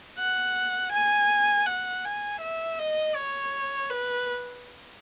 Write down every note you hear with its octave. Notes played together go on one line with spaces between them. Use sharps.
F#5
G#5
F#5
G#5
E5
D#5
C#5
B4